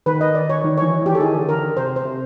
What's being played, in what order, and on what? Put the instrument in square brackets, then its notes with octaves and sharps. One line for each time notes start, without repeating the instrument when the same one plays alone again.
[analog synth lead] D#3 [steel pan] B4
[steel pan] D#5
D5
C#5
[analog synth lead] D#3
[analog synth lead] E3 [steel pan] C#5
[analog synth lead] E3 [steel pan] G4
[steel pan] A4
[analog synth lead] D#3 [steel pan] G#4
[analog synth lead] D3
[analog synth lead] D3 [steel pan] A#4
[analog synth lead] C3 [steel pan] C5
[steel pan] C5
[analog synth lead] C3